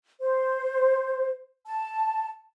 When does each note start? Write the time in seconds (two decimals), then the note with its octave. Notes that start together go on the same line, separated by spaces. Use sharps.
0.21 C5
1.66 A5